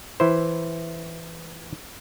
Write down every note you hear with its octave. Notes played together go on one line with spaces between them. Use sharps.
E3 E4 C5